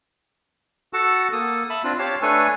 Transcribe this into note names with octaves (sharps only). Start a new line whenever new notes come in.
F#4 A4 F#5 A5
A#3 A4 D#6
E5 A5 B5
C4 D4 F4
G4 C#5 F5 A5
A3 D4 A4 B4 C#5 G#5